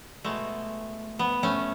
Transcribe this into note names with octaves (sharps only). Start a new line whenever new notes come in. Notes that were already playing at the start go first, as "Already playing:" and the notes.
B2 G#3 A3
B3
A3 C#4